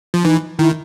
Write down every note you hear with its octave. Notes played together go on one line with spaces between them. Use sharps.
F3
E3 D#4
D#3 E4